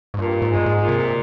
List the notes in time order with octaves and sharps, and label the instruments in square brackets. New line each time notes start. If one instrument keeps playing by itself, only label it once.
[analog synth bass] G#2
[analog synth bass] G2 [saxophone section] A#2
[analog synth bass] G#2
[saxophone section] G#3
[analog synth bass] G2
G#2
[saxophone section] A#2
[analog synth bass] C3